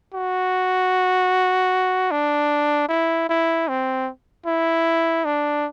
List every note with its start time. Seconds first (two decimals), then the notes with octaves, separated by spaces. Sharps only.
0.14 F#4
2.11 D4
2.89 E4
3.29 E4
3.68 C4
4.46 E4
5.25 D4